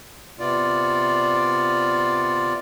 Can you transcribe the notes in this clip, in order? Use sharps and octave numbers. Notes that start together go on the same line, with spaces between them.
C3 B3 F4 D5